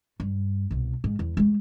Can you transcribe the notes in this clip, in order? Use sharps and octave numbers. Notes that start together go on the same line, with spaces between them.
G2
C2 B2
G#2
E2
G#3 A3